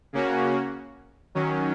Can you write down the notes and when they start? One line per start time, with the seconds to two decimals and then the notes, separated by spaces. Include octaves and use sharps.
0.13 C#3 A#3 C#4 F#4
1.35 D#3 F#3 C#4